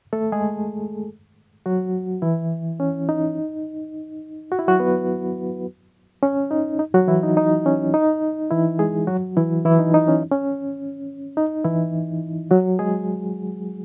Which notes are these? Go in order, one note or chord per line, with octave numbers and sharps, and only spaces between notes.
A3 A4
G#3 G#4
F#3 F#4
E3 E4
C#4
D#4
F#4
E4
F#3 F#4
B3 B4
C#4
D#4
D#4
F#3 F#4
E3 E4
D#4
D#4
C#4
D#4
E3 E4
G#3 G#4
F#3 F#4
E3 E4
E3 E4
D#4
D#4
C#4
C#4
D#4
E3 E4
F#3 F#4
G#3 G#4